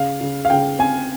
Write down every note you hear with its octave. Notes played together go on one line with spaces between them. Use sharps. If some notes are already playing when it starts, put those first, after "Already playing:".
Already playing: C#3 F5
C#3
F5
C#3 G5
C4 G#5